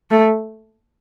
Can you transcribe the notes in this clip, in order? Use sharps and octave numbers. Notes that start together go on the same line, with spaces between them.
A3